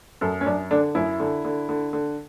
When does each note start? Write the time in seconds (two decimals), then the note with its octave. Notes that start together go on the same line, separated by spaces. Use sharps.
0.21 F#2 A4
0.41 C#4
0.46 F#2 D4
0.71 D3 D4
0.95 F#2 E4
1.20 D3
1.45 D3
1.69 D3
1.93 D3